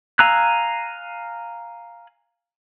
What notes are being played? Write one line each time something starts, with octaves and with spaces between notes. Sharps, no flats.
F5 G#5 A#5 E6 F#6